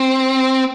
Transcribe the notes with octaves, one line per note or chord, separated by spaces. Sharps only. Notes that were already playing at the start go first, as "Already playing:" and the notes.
Already playing: C4